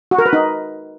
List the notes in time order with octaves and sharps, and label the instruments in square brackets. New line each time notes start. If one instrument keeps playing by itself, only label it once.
[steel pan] F#4
A#4
B4
D#4